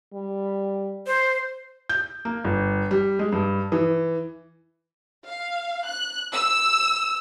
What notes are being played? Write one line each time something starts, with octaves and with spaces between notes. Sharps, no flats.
G3
C5
G6
A#3
G1
G3
G#3
G2
E3
F5
F#6
E6